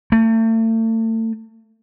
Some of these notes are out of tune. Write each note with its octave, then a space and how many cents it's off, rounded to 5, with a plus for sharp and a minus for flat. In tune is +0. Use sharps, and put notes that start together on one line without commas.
A3 +35